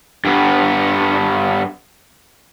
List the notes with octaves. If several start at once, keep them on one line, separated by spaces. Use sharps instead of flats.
G2 B3